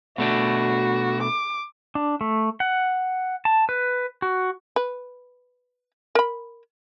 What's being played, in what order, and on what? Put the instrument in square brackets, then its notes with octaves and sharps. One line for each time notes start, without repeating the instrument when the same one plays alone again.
[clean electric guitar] B2 A3 D4 [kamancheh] F#4
[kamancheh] D6
[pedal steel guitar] D4
A3
F#5
A5
B4
F#4
[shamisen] B4
A#4 B5